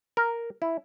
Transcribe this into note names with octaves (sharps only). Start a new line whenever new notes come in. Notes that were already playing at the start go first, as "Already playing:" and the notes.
A#4
E4